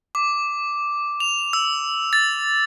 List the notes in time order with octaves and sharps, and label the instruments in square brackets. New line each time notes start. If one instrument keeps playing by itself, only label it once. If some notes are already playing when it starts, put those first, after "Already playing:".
[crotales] D6
F7
E6
A6